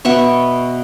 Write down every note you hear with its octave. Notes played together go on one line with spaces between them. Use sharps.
B2 B3 E5 C#6